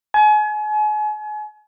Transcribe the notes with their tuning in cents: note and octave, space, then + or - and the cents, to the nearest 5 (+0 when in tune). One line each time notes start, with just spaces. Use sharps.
G#5 +35